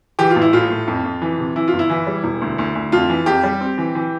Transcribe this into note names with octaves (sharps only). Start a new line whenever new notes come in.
E3 G4
F4
A1
E4
A2 F4
A2
F2
F2
E3
C3
E3 E4
F4
G1
E4
E3
G3
E1
D2
D2
D2
F2 F4
E3
F2 G4
G3
C4
E3
E3